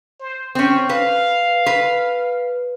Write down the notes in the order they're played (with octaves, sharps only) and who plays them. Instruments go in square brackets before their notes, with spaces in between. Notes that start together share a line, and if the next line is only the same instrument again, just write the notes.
[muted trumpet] C5
[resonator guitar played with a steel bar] C4 C#4 [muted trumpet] G4
[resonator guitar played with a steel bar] B4 [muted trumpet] F5
[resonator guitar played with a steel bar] B4